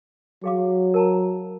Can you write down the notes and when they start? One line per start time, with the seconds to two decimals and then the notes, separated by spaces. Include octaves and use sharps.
0.44 F#3 G#4 F5 D6
0.94 A#4 A5 A#5